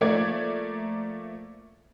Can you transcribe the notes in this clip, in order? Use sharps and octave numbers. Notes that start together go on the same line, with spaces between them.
F3 A3 A#3 D5 G#6